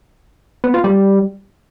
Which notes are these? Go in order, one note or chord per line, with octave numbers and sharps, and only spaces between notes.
B3
F4
G3